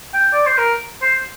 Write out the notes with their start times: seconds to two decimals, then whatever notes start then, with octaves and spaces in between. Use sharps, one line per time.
0.14 G5
0.33 D5
0.46 C5
0.58 A#4
1.02 C5